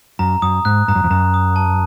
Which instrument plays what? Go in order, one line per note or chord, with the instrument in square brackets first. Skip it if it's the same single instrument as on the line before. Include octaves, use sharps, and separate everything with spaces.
[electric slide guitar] F#2 [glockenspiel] A#5
[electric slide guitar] F#2 [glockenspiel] D#6
[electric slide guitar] G#2 [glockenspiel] F#6
[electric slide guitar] G2 [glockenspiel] A#5
[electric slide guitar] F#2
F2
[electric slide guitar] F#2 [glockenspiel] A#5
[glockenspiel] D#6
A5